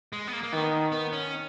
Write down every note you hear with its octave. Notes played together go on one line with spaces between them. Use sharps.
G#3
B3
A#3
A#3
D#3 B3
B3
C#4